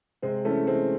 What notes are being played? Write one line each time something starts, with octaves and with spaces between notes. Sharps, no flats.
C3 G#3 C4
E3 A3 C#4
E3 G#3 C4